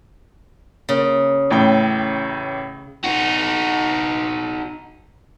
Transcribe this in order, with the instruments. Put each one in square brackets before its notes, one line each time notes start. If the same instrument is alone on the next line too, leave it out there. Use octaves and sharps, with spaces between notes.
[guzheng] C#3 [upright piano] A#3
[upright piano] A1 A2 G5
[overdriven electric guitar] D#4 F#4